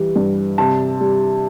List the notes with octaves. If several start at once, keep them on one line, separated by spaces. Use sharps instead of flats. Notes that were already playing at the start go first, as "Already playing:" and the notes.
Already playing: E3 G3
G2
C3 A5
G3